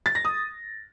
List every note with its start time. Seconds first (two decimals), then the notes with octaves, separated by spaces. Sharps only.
0.06 A6
0.15 A#6
0.25 D#6